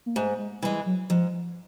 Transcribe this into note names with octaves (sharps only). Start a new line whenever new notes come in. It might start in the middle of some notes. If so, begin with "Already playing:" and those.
A#3
G#2 A3
G#3
E3 G3 G#3
F#3
G#2 F3